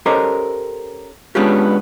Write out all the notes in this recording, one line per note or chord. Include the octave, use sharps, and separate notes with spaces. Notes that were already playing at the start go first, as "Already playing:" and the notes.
C#4 G4 A4 A#4 C5 D#5
G#3 B3 C#4 D4 F4 G4